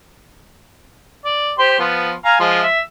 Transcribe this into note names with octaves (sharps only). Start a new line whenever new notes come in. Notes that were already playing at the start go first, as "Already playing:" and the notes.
D5
G4 C5 C6
F3 B3
F5 G#5 A#5
F3 G#3
E5